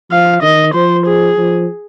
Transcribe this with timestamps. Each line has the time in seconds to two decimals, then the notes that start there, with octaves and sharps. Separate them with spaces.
0.11 F3 F5
0.42 D#3 D#5
0.74 F3 C5
1.06 G#4
1.38 F3